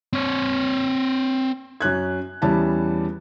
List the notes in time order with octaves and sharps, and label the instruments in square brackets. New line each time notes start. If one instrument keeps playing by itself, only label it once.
[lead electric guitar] C4 C#5
[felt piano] F#2 C#4 F#6 G#6
E2 G3 C#4 E4 A5